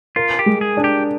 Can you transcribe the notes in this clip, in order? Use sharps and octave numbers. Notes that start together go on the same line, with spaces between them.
F4 A#4
G4
G#3
G#4
D4
G4